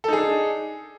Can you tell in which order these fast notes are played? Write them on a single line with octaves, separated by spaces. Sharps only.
A4 D#4 G#4 D4